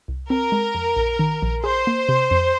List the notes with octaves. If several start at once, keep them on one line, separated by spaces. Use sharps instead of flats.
C2
C4 A#4
G#3
F2
A#1
D#3
A#1
G#4 C5
A#3
C3
F2